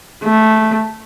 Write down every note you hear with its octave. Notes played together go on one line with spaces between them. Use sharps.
A3